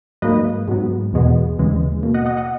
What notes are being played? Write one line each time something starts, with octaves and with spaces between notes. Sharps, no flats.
G#2 F#3 A#3 B4 D#5
G#2 F#3 B3
E2 B2 G#3 B3
D#2 C#3 E3 G#3
B2 A#3
D#5 F#5
D#5 F#5
D#5 F#5